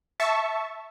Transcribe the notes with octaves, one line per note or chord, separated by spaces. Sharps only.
E5 A5 C#6